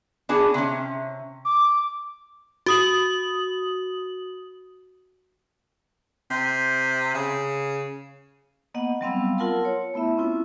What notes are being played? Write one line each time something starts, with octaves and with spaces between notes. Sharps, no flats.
B3 D4 F#4 G#4
C3 C#4
D6
F#4 D#6 F#7
C3
C#3
A#3 B3 D#5 F#5
F#3 G3 B3 C4 F5 E6
F4 A#4 F#5 A5 C6 E6
C#5
A3 B3 E4 E5
C4 C#4 E4 F4